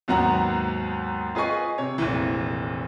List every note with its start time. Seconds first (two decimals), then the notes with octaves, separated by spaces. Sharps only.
0.08 D#2 G#2 F#3 B3 F#5 A#5
1.35 F4 G#4 B4 D#5 G#5 C#6
1.78 C3 C#5
1.98 F1 A#1 E3